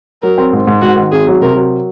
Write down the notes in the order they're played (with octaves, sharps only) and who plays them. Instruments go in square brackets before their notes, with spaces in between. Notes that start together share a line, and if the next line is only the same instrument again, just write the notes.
[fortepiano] F#3 [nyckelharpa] A#4
[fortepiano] C4
G#2
G#2
[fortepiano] G#2 [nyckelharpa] F#4
[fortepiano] D#3
[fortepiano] G#1 [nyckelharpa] G#4
[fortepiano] F#3
[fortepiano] C3 [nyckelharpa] A#4
[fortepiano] F#3